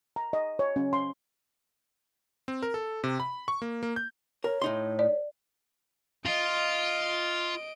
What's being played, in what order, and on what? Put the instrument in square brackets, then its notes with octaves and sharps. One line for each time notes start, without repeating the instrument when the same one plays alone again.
[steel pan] A#5
D#5
C#5
C#4
C6
[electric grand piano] C4
A#4
A4
C3
B5
C#6
A#3
A#3
G6
[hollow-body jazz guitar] A#4 [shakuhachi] C#5
[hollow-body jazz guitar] A2 D#4 C6
[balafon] D5
[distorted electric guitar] F4 [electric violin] D#5 D7